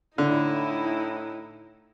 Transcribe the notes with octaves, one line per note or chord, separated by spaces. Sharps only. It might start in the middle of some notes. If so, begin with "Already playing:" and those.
A2 D3 D#4 E4